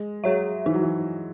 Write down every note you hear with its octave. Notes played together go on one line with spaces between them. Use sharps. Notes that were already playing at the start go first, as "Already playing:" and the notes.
Already playing: G#3
F#3 G#4 C#5 E5
E3 D#4
F#3
E3